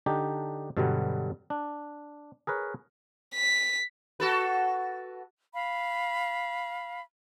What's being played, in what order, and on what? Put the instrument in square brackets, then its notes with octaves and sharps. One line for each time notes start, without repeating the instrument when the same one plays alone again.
[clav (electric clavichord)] D3 D4 D#4 G4
G2 B2 D3 F#3 G3 B3
D4
G#4 A#4 B4 C#5
[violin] B6
[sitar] F#4 A4 B4
[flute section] F5 B5